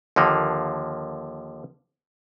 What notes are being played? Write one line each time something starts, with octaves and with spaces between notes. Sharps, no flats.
D#2 D3 F3 A#3